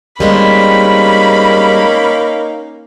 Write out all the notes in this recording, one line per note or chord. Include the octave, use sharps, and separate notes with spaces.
G3 G#3 A#3 C4 C#4 D#4 B5